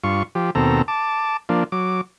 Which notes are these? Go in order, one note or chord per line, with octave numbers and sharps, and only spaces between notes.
G2 F4 C#6
F3 G4
D#2 B2 C4 A4 A#5
A5 D6
F3 A#3 D4
F#3 D6